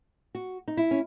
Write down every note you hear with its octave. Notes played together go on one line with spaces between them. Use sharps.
F#4
D#4
E4
C#4